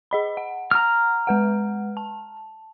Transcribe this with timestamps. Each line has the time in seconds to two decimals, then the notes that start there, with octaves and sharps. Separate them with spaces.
0.11 G#4 D#5 B5
0.37 F#5
0.71 A#5 F6
1.27 G#3 B4 F#5
1.97 A5